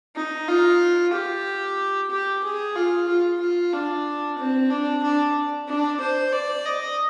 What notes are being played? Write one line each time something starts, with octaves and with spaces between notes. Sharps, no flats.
D#4
F4
G4
G4
G#4
F4
F4
F4
D4
C4
D4
D4
D4
C5
D5
D#5